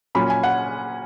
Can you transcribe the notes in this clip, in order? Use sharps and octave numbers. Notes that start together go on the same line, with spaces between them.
A#2 F#3 C#4 B5
G#5
F#5